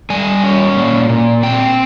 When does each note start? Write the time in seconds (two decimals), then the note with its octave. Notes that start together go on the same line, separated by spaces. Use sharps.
0.10 G3 G#5
0.43 C#4
0.76 A#2
1.09 A#2
1.43 C4 G5